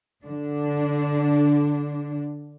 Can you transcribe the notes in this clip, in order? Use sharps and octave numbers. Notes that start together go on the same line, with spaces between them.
D3 D4